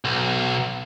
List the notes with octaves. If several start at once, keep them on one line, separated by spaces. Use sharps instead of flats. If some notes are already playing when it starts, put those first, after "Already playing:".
B1